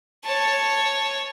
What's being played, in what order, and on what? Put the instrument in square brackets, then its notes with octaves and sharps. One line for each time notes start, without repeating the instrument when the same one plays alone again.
[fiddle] C#5 A5